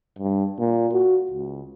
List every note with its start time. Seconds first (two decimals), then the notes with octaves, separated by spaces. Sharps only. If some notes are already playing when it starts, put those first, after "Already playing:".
0.18 G2
0.59 A#2
0.93 F#4
1.31 C#2